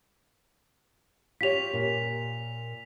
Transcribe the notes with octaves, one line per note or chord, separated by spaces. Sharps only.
F4 G4 C#5 B6 F7
A#2